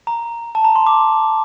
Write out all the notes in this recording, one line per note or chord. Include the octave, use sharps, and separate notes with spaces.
A#5
A5
A#5
C6
D6